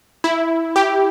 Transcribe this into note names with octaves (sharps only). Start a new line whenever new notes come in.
E4
G4